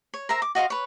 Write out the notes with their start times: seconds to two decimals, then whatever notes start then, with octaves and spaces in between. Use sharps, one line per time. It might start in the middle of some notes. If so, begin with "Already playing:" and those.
0.14 C#5
0.29 A#4 C5 E5 A#5
0.42 D6
0.55 F#4 D#5 F5 C6
0.70 B4 C#5